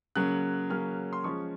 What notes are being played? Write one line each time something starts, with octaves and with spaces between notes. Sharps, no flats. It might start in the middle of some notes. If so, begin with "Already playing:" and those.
C#3 F#3 A#3 C#4 F#6
C#3 F#3 A#3 C#4 F6
C6
F3 G#3 C#4 C#6